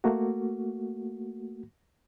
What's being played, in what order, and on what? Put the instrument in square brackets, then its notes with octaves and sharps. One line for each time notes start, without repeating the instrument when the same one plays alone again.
[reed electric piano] A3 A#3 F#4